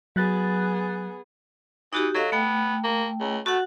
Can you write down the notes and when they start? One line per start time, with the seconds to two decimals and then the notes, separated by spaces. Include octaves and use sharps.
0.16 F#3 B3 G#4 F#6 A6
1.93 E3 D#4 F#4 G4
2.15 F#3 A4 D#5 F5
2.32 A3 B3 G5
2.84 A#3
3.20 C#2
3.46 A3 F#4 F#5